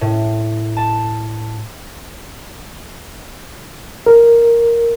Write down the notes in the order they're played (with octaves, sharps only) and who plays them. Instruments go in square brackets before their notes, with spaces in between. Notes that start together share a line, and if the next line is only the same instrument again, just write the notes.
[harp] A2
A5
[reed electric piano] A#4